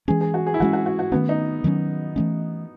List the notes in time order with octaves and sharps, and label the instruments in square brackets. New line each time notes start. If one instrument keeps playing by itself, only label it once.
[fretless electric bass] E3 G#3 C#4 [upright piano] G#4
[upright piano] G#4
F#4
G#4
E4
[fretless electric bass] E3 G#3 C#4 [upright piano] F#4
[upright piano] F#4
F#4
F#4
[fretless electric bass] D#3 F#3 A3 C#4 [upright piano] B3
[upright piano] D#4
[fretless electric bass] D#3 F#3 A3 C#4
E3 A3 C#4